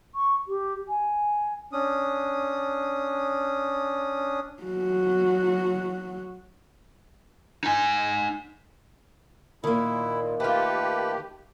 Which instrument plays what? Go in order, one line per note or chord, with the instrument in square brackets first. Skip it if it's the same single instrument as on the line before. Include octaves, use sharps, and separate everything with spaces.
[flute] C#6
G4
G#5
[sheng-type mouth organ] C#4 D4 D#6
[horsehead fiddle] F#3 F#4
[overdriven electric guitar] D#4 G#5
[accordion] A#2 [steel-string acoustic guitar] D#3 A#3 [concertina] E4
[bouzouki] A3 F4 [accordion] G4 [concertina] B4